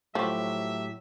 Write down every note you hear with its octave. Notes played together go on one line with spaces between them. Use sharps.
A2 F3 F#3 F#4 G4 E5